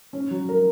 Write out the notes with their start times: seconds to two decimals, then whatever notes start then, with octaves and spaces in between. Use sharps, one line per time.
0.13 C#4
0.31 F#3
0.49 A#4